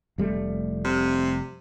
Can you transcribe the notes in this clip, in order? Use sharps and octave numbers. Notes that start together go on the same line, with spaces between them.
F1 G3 A3
C3